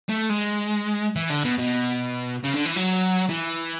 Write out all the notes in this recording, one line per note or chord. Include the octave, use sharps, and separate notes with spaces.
A3
G#3
E3
D3
B2
B2
C#3
D3
E3
F#3
E3